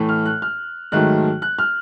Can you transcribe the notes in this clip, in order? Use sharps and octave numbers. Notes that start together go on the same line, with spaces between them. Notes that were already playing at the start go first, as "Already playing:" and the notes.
Already playing: A2 E3 A3
F6
F#6
F6
G#2 D#3 F#3 A3 F#6
F#6
F6